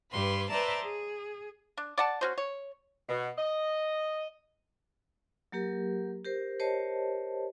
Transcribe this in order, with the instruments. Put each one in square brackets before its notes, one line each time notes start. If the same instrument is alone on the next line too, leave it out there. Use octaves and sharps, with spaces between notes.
[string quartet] G2 G4 B4 C6
B4 C5 D5 E5 A5 A#5
G#4
[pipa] D4
D5 F#5 A5
C#4 F#4 C5
C#5
[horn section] B2
D#5
[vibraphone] F#3 A#3 G4 A#4
G4 A#4 C5
G4 A#4 C5 C#5 D#5 A5